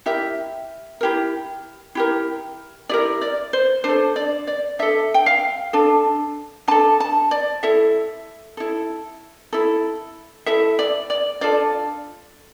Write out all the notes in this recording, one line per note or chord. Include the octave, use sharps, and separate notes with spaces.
E4 G4 A#4 E5
E4 G4 A#4
E4 G4 A#4
E4 G4 A#4 D5
D5
C5
D4 A4 C5
D5
D5
D4 A4 E5
G5
F5
D4 A4
D4 A4 A5
A5
D5
E4 A4 E5
E4 A4
E4 A4
E4 A4 E5
D5
D5
D4 F4 A4 D5